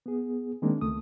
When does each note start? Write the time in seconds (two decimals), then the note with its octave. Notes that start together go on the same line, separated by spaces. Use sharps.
0.06 B3 G#4
0.62 D#3 G#3 A#3 C4 D4
0.81 C#2 A3 D#6